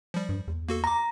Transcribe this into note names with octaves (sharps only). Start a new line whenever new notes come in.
F3 G3
G2
E2
A#3 F#4 A4
A#5 D6 A#6